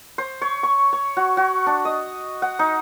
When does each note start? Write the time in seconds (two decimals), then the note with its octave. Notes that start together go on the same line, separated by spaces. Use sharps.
0.18 C5
0.42 C#5
0.63 C#6
0.93 C#5
1.17 F#4
1.37 F#4
1.66 D4
1.85 D#5
2.42 F#5
2.59 D#4